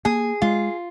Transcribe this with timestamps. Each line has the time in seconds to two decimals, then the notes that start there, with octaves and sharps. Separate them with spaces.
0.05 A#3 G#4
0.42 G#3 F4